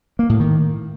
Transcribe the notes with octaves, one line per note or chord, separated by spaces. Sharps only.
A#3
A2
D#3